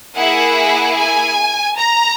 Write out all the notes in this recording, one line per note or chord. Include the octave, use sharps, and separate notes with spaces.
A#3 E4 G#4 F#5
G#5
A#5